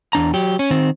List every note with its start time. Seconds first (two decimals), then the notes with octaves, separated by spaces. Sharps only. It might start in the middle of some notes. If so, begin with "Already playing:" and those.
0.13 E2 D4 A#5
0.34 F#3 G4
0.59 C#4
0.71 D#3 C4